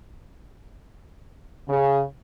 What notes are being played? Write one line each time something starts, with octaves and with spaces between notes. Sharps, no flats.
C#3